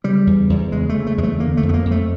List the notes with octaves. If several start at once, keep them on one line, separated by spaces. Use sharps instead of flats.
C#3 G3
E2
E2
C#3 G#3
A3
C#3
A3
E2 G#3
A3
D3 A#3
A3
F2
B3
A#3
F2
A3